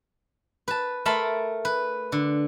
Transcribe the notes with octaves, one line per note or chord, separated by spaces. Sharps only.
B4 A5
A3 A#4 A5 B5 C6
B4
D3